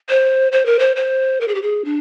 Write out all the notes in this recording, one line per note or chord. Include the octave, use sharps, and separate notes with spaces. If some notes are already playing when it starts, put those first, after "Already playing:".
C5
C5
A#4
C5
C5
A#4
G#4
G4
G#4
D4